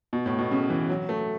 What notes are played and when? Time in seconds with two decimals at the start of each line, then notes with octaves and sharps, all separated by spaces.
0.13 B2
0.26 A2
0.38 B2
0.51 C#3
0.70 E3
0.90 F#3
1.09 A3